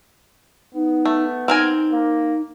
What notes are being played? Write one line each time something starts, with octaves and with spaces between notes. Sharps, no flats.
B3 D#4
A3
C4 D#4 A#4 G#5
A#3